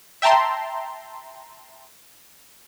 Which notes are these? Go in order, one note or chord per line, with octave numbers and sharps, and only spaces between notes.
E5 G5 A5 A#5 C6